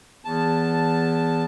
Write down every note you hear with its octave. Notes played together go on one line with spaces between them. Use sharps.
E2 A5